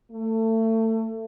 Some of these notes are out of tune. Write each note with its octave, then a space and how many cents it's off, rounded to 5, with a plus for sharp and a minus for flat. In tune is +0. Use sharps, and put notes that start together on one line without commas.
A3 +25